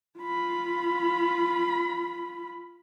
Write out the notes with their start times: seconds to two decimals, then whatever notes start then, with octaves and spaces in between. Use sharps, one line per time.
0.18 F4 B5